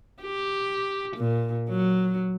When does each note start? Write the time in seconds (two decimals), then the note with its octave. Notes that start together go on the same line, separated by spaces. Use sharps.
0.22 G4
1.17 A#2
1.69 F#3